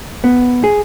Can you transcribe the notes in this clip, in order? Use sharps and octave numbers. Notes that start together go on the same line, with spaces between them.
B3
G#4